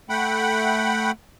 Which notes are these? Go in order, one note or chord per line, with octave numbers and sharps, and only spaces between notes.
A3 F#5 G5 B5